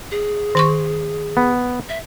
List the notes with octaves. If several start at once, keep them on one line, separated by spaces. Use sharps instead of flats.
G#4
D#3 C6 C#6
B3
E5